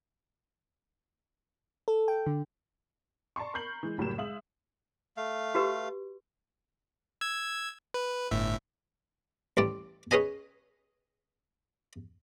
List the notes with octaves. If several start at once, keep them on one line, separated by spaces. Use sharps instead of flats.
A4
G5
D3
D5 A5 A#5 C6 C#6
A#4 B5 C#6 G6 C7 F#7
E3 G#3
F#1 A2 F#3 G3 A#4 E7
G#3 E5 F5 D#6 F#7
A3 F5
F#4 G4 B4
E6 G#6
B4
G1 A2 E5
A1 G3 D5
C#4 G#4 B4 D#5 G#5